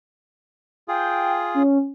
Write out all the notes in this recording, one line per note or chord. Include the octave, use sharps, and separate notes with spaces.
F4 G#4 G5
C#4